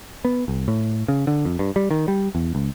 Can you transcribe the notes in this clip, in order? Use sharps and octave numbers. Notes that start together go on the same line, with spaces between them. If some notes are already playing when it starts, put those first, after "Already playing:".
B3
C2
A2
C#3
D3
F2
G2
G3
D#3
G3
E2
C#2